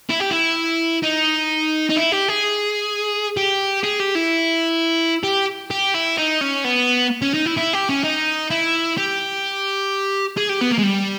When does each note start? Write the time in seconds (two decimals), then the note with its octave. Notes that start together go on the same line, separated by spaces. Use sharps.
0.10 E4
0.20 G4
0.31 E4
1.03 D#4
1.90 D#4
1.97 E4
2.12 G4
2.29 G#4
3.37 G4
3.83 G#4
3.99 G4
4.15 E4
5.23 G4
5.71 G4
5.94 E4
6.18 D#4
6.41 C#4
6.64 B3
7.22 C#4
7.34 D#4
7.46 E4
7.57 E4
7.73 G4
7.89 C#4
8.04 D#4
8.51 E4
8.97 G4
10.37 G#4
10.49 G4
10.61 B3
10.72 A#3
10.79 G#3
10.84 G3